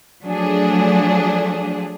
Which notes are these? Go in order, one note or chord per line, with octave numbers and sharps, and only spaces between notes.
F3 F#3 A3 D4 G#4